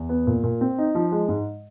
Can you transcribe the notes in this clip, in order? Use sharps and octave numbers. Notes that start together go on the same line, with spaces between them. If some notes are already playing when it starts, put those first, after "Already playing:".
Already playing: E2
B3
A#2
A#2
C4
D#4
F3
G#3
G#2